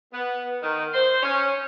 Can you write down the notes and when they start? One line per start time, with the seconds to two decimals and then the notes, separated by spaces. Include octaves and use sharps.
0.12 B3
0.62 D#3
0.93 C5
1.22 C#4